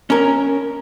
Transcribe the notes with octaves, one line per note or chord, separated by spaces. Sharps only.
C#4 A#4